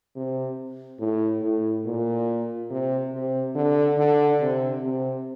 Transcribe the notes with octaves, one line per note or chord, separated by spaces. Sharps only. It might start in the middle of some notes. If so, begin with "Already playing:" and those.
C3
A2
A2
A#2
C3
C3
D3
D3
C3
C3